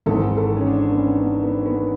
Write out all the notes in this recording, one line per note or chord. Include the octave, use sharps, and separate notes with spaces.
G#1 G#2 E3 A4
A4
C#4
D4
B3
C#4
B3
B3
B3